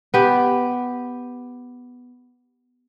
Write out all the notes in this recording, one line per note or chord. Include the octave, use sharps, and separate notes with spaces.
B3 G4